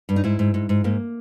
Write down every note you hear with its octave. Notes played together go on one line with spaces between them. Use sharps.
G2
D#4
G#2 E4
G#2
G#2
G#2
G#2 A#3